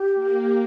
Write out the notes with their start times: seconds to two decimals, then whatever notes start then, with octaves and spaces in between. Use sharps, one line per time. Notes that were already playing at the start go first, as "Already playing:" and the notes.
Already playing: G4
0.14 A#3